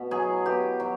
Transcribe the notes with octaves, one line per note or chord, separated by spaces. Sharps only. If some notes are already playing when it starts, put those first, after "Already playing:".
Already playing: B2
F#3 G#4
B2 G4
F#3